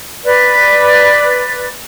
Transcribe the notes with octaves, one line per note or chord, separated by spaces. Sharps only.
B4 D5